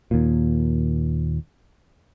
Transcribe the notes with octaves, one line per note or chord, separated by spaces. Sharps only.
D#2 A#2